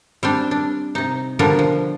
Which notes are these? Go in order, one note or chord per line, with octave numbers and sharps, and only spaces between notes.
G3 C4 D4
D4
C3 D#4
B2 D3 F3 G3 D4 A#4
F3